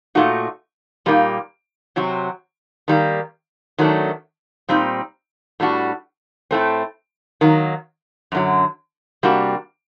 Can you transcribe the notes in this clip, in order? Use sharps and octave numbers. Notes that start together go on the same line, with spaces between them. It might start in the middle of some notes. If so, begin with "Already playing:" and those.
A#2 A3 D#4 F#4
A#2 G3 A#3 D#4
C3 F#3 C4 F#4
D#3 G3 A#3
D#3 F#3 A3 D4
A#2 G3 C4 D#4
A2 G3 D4 F#4
A2 A3 C4
D#3 F#3 A#3
F#2 D3 F#3
C3 G3 A#3 D4 F#4